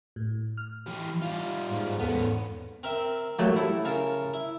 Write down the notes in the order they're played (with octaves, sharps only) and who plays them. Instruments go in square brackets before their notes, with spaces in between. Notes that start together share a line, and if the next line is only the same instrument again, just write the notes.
[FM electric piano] A2
F6
[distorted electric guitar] E3 G4
G3 F4
[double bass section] G#2
[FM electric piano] E2 A4 F#5 [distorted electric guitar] B3 C#4
[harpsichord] C4 A#4 E5
[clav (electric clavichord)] F#3 A3 A#3 [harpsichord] G4
[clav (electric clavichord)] E4 [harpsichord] A4
[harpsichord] C#3 A#4 A5
E4